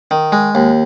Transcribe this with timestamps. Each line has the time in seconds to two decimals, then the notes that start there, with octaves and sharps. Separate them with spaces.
0.11 D#3
0.32 G#3
0.55 D#2